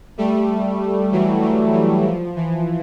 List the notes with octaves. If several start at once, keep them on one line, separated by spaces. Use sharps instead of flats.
G3 A3
E3 F#3
E3 F#3
E3
F3
E3